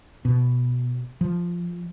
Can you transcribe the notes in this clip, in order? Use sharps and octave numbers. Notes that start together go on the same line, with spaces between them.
B2
F3